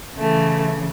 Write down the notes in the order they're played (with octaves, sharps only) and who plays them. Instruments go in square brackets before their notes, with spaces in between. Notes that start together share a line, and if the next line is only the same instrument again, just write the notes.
[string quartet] C#3 E3 A3